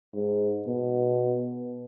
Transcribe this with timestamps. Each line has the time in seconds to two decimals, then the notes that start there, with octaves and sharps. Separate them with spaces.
0.14 G#2
0.67 B2